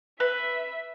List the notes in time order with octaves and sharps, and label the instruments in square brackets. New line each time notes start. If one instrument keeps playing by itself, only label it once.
[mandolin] B4 [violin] E5